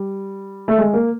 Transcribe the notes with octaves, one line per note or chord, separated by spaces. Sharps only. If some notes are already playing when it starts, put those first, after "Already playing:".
Already playing: G3
A3
G#3
A#3